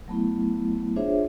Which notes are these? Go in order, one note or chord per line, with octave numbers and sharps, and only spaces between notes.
F#3 A3 B3 E4
D4 F4 G#4 C5 C#5 E5